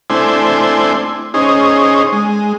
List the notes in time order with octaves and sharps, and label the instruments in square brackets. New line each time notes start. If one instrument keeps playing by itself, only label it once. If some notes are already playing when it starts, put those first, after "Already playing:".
[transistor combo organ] A3 C4 D4 E4 C5 G#5
C#4 D#4 G#4 C5
G#3